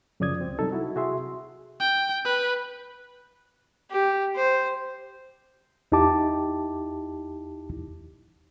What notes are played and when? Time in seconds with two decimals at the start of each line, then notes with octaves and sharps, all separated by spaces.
0.20 F#2 C#3 F3 D5 D#6 G#6
0.41 C#2 C4
0.59 C3 F#3 G3 D#4 A4
0.72 E4 F#4
0.95 C3 F#4 G#4 E5 C6
1.80 G5
2.25 B4
3.91 G4
4.36 C5
5.92 E2 D#4 E4 G4 A5 D6